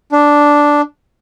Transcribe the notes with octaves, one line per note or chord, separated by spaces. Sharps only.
D4